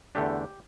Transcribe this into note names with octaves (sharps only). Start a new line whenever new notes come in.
E2 D3 A3 D4 G4